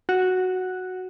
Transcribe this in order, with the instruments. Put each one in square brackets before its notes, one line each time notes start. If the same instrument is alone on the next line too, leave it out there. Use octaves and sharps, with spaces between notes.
[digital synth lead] F#4